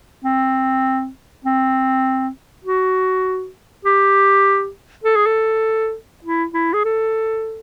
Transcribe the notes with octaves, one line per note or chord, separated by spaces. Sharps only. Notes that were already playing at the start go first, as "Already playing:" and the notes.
C4
C4
F#4
G4
A4
G#4
A4
E4
E4
G#4
A4